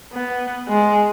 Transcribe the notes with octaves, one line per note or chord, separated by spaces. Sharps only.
B3
G#3